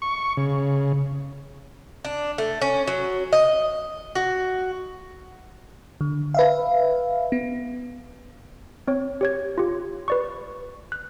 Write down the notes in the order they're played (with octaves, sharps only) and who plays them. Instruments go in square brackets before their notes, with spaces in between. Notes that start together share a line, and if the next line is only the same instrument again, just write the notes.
[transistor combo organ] C#6
C#3
[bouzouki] D4
A3
C#4
F#3
D#5
F#4
[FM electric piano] D3
B4 E5 F5
B3
[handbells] C4 C#5
G4 C#5 G#6
F4 G4
B4 D5 C#6
F#6